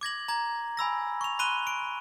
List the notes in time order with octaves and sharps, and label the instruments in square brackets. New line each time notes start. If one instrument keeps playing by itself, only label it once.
[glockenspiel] D6 G#6 A#6 F#7
A#5 G#6
G#5 B5 E6 A#6
C#6 F7
B5 C6 F#6 D#7 G7
D7